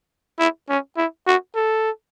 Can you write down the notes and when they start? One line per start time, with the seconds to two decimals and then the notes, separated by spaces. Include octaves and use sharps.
0.39 E4
0.69 C#4
0.97 E4
1.27 F#4
1.56 A4